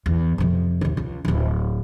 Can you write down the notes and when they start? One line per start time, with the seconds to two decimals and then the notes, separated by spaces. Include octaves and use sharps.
0.06 E2
0.38 F2 C3
0.81 D#2 C3
0.97 C#2
1.25 D1 G#1